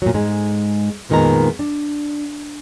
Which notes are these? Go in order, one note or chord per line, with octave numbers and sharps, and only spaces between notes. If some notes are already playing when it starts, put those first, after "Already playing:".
A#2 F#3
G#2 G#3
F2 A#2 D#3 G#3 B3 A#5
D4